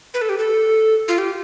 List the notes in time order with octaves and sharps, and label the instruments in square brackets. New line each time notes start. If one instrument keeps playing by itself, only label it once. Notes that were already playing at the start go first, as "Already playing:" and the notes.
[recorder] B4
A4
G4
A4
F4
G4